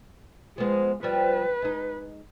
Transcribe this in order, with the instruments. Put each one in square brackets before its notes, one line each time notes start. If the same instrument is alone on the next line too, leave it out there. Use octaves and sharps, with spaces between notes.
[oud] F3 B3 [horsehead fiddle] G#3
[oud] F3 G3 [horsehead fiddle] B4
[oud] G#3 D#4